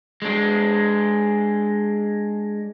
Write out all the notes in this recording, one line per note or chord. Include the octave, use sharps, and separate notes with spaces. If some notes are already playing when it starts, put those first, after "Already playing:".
G#3 D4